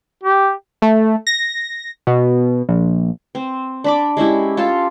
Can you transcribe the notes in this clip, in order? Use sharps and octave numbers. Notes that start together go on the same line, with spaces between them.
G4
A3
A#6
B2
A#1
C4
D4 B5 D6
G#3 C#4 E4 G4
F4 G4 A4 F5